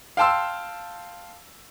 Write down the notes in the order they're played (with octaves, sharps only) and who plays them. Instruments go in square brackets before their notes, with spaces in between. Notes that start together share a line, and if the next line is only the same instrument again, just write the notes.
[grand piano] F5 G5 A5 C6 E6